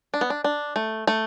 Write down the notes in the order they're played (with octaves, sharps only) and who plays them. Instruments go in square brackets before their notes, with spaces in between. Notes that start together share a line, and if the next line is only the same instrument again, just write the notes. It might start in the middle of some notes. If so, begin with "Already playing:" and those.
[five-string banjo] D4
B3
D4
D4
A3
A3